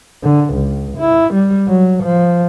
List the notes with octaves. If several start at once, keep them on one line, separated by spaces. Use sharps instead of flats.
D3
C#2
E4
G3
F#3
F3